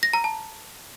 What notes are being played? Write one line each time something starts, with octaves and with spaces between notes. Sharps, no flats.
A#6
A#5
A5